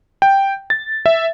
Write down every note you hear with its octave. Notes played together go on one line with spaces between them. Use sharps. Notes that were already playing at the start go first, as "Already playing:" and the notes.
G5
A6
E5